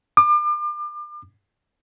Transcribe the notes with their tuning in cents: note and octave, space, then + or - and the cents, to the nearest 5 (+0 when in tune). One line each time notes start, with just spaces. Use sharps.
D6 +35